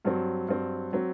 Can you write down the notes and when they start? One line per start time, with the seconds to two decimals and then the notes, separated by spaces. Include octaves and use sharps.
0.05 G2 F#3 C4
0.48 G2 F#3 C4
0.93 F#3 C4